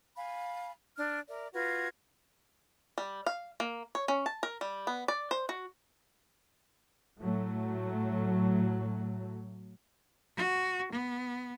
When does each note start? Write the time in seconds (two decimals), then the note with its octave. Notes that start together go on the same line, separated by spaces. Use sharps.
0.16 F5 G#5 B5
0.95 D4 F6
1.28 A#4 D5 E5
1.52 F4 F#4 B4 G#6
2.98 G3
3.26 F5
3.60 A#3
3.95 C#5
4.08 C#4
4.26 A5
4.43 A#4
4.61 G3
4.87 B3
5.08 D5
5.31 C5
5.49 F#4
7.20 A2 F#3 A3
10.37 F#4
10.92 B3